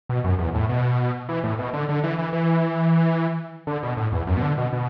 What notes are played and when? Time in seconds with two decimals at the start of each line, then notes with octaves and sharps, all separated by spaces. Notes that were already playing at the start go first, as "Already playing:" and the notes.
0.09 B2
0.24 F#2
0.39 E2
0.55 A2
0.69 B2
1.29 E3
1.44 A2
1.59 B2
1.73 D3
1.89 D3
2.04 E3
2.18 E3
2.33 E3
3.67 D3
3.83 B2
3.97 A2
4.12 E2
4.27 F#2
4.37 B2
4.42 D3
4.58 B2
4.73 B2